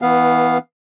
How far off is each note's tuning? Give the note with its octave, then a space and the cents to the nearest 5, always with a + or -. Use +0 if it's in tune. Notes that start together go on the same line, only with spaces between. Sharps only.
E3 -30 B3 +0 F5 +0